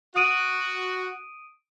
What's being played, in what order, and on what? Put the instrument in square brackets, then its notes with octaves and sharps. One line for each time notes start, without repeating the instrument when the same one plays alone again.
[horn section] F#4 [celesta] D#6 D7 D#7